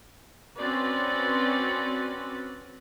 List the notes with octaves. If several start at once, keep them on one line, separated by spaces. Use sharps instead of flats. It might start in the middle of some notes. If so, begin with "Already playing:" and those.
C4 C#4 F#4 B4 D5